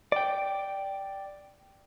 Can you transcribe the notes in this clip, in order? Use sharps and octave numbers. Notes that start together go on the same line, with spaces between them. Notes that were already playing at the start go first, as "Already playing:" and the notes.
D5 G5